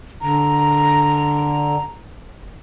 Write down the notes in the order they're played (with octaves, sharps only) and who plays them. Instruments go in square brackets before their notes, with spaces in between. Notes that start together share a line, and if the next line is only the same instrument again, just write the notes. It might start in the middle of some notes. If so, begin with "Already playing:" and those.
[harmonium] D3 [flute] A#5